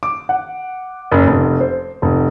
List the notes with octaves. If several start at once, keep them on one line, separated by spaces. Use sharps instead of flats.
D6
F#5
F#1
F1
C5
F1